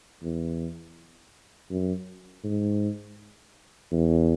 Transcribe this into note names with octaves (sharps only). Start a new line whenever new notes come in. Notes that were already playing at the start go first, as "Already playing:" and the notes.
E2
F#2
G#2
E2